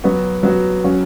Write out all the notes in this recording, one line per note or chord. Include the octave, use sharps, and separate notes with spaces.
F#3 B3 F#4
F#3 B3 F#4
F#3 C#4 F#4